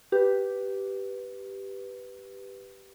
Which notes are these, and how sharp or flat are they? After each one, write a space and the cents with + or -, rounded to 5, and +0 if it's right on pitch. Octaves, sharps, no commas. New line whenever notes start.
G4 -5 B4 +0